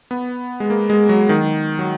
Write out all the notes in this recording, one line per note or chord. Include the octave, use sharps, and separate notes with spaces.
B3
G#3
A#3
G#3
F#3
D#3
F#3